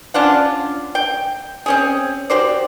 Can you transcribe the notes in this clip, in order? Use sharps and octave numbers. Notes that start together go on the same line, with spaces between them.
C#4 D4 F4 F#5
G5
C4 C#4 G#4
F#4 G4 C5 D5